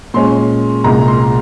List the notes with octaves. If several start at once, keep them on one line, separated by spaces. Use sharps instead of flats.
A#2 G#3 C#4 C6
C2 A#2 G#3 A#5
C6